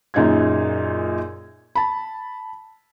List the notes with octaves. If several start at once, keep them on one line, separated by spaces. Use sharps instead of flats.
F#2 A#2 D#4 G#4 G#6
A5 B5